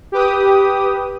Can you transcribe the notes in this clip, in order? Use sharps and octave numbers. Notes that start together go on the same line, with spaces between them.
G4 B4 D#6